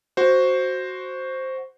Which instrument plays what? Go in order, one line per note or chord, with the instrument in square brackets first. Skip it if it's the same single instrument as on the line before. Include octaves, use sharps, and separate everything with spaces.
[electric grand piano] F#4 C5